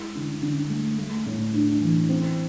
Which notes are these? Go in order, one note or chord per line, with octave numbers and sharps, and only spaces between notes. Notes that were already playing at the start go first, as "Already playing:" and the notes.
Already playing: G#3 E4
D3
D3
A3
A3
A2
D4
E3
C4